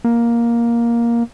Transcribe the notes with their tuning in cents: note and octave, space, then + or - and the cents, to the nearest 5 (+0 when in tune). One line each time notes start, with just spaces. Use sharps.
A#3 +10